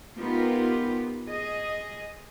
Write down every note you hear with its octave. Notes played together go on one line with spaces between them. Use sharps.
B3 D#4 F4 G4 A#4 B4
G#4 D#5